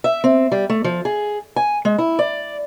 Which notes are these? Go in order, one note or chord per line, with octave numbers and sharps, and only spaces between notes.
E5
C4
G3
A3
F3
G#4
G#5
G#3
E4
D5